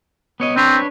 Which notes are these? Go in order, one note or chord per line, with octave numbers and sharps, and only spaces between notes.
B3 C#5 D#5
C4 D4 B4 C#5